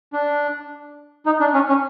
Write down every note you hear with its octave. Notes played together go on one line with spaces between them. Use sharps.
D4
D#4
D4
C#4
C#4